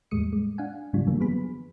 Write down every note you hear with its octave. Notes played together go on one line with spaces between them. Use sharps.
E2 A2 G3 G#3 D#6 C#7
G#3
D4 F5 F#5 G#5
G#2 C#3 F#3 G3 D4 F4
F#2 D3 E3 G3 A#3
F3 F#3 B3 G#4 B5